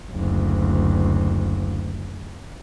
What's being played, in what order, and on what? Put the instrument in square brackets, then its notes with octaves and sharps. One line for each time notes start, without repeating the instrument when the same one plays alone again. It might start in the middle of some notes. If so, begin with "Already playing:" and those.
[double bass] F#1 D2